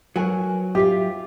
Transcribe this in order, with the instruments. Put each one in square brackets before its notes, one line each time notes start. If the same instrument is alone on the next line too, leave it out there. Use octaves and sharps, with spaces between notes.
[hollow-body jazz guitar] F#3 [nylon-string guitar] F#4 A#4 G#5
[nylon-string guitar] F4 E5 F5 [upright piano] G4